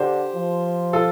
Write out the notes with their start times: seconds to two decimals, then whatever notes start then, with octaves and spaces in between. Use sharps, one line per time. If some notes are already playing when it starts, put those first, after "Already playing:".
Already playing: D3 G4 C5
0.35 F3
0.93 F4 A4